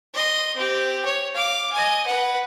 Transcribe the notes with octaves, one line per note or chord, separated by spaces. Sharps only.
D#5 C6
C4 G4
C#5
F5 D6
D#5 G#5
B4 F#5